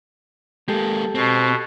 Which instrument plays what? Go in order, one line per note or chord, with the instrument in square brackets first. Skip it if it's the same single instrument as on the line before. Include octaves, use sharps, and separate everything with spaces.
[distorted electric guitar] G#3 A#3 [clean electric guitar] G4 A4
[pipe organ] B2 [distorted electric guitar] C4